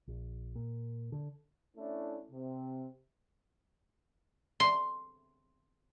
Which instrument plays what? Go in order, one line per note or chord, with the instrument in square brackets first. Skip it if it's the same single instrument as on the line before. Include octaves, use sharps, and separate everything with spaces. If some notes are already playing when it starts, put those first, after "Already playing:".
[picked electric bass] A#1
A#2
D3
[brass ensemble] A3 C#4 D4 E4
C3
[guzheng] C6